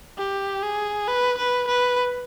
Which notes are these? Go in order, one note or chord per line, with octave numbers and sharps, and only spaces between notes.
G4
G#4
B4
B4
B4